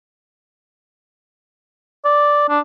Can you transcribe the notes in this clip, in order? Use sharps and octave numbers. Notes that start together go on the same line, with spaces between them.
D5
D4